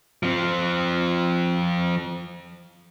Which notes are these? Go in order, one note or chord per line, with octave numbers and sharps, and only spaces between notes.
F3 C4